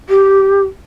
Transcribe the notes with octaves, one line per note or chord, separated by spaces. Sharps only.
G4